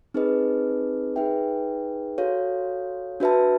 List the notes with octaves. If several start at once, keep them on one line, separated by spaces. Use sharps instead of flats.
C4 D#4 G#4 B4 D#5
D#4 G#4 B4 E5 G5
F#4 A4 C#5 F5
D4 F#4 B4 E5 A5